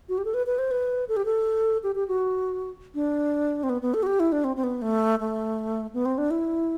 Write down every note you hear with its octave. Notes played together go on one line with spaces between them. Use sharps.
F#4
G4
A4
B4
B4
C5
B4
A4
G4
A4
G4
G4
F#4
D4
C4
B3
B3
A4
F#4
G4
E4
D4
C4
C4
B3
A3
A3
B3
C4
D4
E4